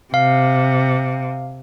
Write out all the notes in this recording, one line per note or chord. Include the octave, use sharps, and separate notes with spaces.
C3 F5